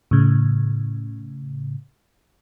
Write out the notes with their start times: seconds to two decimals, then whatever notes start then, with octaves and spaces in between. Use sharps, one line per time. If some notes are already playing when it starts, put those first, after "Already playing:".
0.11 A2 C#3